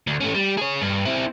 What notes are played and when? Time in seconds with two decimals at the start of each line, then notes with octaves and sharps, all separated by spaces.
0.07 D2
0.21 A3 C#4
0.35 G3
0.58 G#4 C#5
0.82 G2
1.05 C4 E4